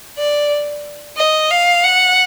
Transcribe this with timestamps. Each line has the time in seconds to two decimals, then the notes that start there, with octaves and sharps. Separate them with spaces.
0.18 D5
1.17 D#5
1.51 F5
1.84 F#5